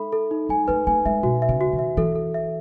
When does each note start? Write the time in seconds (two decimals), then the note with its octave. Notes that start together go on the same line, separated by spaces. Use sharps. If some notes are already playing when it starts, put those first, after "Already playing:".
Already playing: G#3 D#4 A4 E5 B5
0.12 A4
0.31 D#4
0.49 G#3 G#5
0.68 A3 B4
0.87 A3 G#5
1.06 G#3 E5
1.23 B2 F#4
1.42 E5
1.49 C#3
1.61 F#4
1.73 D#3
1.79 E5
1.97 E3 A4
2.16 A4
2.34 E5